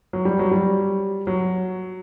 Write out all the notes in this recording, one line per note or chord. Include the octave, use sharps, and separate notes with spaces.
F#3
G3
F#3
G3
F#3